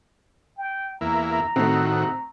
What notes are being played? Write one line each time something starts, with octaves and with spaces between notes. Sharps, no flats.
G5
E2 A#3 E4 A#5
A2 D#3 A3 C4 F#4
A#5